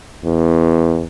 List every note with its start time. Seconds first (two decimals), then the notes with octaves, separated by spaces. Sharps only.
0.25 E2